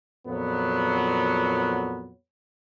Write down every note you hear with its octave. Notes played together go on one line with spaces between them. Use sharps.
F2 A#2 F#3 B3